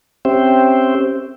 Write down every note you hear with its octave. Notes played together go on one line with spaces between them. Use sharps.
C4 C#4 G4 C5 E5 G5